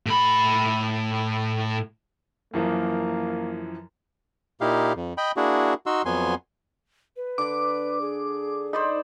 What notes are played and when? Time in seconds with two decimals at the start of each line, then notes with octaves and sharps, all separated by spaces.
0.06 A2 B5
2.54 F#2 E3 F3 A#3
4.61 A#2 D#4 E4 G4 F5
4.96 F2
5.18 D#5 G5 B5
5.37 A#3 D4 E4 F#4 G#4
5.86 D#4 F#4 C6 E6
6.06 F2 F#3 B3 G#5 C6
7.16 B4
7.38 D3 D5 D6
8.01 G#4
8.73 D#4 C5 D5 B5